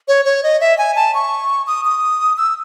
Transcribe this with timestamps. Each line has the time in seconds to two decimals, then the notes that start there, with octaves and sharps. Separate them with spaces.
0.08 C#5
0.25 C#5
0.43 D#5
0.61 E5
0.78 G#5
0.96 A5
1.14 C#6
1.67 D#6
1.85 D#6
2.37 E6